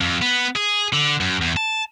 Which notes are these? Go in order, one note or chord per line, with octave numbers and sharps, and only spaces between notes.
F2
B3
G#4
D3
F#2
E2
A5